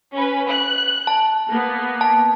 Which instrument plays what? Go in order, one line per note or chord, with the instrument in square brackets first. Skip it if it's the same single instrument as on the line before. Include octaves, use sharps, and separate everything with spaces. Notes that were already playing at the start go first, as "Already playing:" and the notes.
[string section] C#4 B4
F#6
[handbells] A5
[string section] A#3 B3
[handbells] A5